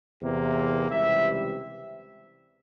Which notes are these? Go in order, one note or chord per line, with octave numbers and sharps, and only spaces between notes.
E2 C3 E3 A#3
C#2 C3 E3 G3 E5